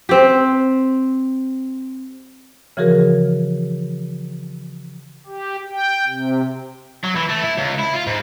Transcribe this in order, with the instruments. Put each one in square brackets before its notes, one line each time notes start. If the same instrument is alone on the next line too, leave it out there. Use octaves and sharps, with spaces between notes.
[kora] C4 G4
[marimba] C#3 E3 F3 F#4 G#4 A#4
[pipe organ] G4
G5
C3
[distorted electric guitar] F#3
E3
A3
E4
C#2
E4
F4
G#2